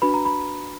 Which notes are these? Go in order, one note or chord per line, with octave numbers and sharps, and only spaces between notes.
D4 F#4 B4 B5
A#5
B5